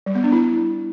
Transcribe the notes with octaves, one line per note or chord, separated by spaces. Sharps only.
G3
B3
D4
E4